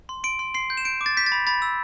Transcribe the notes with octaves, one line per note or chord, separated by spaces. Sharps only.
C6
C6 D7
C6
C6 C7
G6
E7
G6 D7
D6
A6
G6 B6
A6
B5
B5 A6
E6